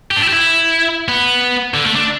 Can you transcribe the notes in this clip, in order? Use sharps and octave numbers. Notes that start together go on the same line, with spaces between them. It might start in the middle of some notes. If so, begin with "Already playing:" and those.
G4
D4
E4
G4
E4
B3
D3
A3
D4